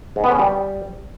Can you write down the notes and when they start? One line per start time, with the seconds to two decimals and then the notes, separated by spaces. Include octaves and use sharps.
0.16 G#2
0.24 B3
0.31 C#4
0.39 G3